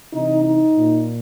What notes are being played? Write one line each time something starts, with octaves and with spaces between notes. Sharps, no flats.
C3 E3 D#4
D#4
A#2